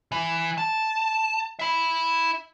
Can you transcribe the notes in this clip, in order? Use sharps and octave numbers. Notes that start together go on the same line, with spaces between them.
E3
A5
E5 B5